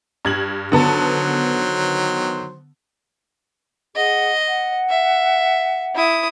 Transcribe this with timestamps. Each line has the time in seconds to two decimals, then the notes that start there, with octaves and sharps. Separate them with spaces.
0.25 G2 G#6 F#7
0.72 D3 D#3 F#3 B3 C5 A5
3.95 G#4 D#5 F#5
4.47 F#5
4.89 E5
5.95 E4 D#6